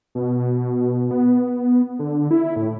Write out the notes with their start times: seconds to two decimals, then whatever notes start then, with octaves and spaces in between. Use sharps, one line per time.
0.15 B2
1.11 B3
1.99 D3
2.31 E4
2.56 A2